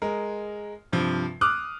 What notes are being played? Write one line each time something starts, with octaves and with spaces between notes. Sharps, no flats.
G#3 A#4
G2 C3 F3
D6 D#6 F6 F#6